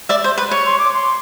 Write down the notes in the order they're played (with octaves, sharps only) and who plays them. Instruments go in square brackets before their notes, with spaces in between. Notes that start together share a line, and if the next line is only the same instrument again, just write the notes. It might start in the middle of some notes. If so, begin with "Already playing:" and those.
[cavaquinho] D5 E5
C5
B4
[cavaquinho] C#5 [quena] C#6
[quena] C6
D6
C6